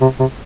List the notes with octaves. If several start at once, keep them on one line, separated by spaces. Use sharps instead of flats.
C3
C3